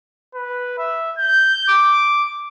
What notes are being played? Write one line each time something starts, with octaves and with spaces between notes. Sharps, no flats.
B4
E5
G6
D6